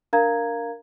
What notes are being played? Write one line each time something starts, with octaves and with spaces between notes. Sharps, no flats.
D4 A#4 F5 A#5 G#6